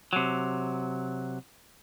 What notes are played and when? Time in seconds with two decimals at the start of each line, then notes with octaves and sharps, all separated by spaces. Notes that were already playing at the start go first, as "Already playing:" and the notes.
0.13 C3 F#3